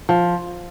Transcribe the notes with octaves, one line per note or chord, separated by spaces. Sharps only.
F3